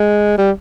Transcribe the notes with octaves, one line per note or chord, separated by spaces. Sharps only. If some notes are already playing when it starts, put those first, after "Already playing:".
Already playing: G#3
G3